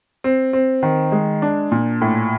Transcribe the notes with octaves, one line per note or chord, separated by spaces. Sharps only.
C4
C4
D#3
G#3
D4
A#2
A2